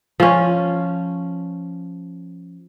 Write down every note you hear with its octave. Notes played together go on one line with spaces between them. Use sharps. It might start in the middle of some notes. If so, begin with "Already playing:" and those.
F3 C#4